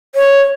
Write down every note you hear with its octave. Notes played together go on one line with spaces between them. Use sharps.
C#5